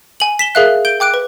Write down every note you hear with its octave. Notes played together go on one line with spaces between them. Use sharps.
G#5 F#7
B6 E7 G7
G#4 A#4 E5 F5 F#6
G6 D7 G7
G5 D6 F#6 D7
B4